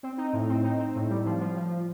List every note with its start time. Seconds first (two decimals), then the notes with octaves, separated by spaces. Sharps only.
0.03 C4
0.18 D#4
0.33 A2
0.49 C4
0.64 D#4
0.79 C4
0.95 A2
1.10 G3
1.25 F3
1.40 F3
1.57 F3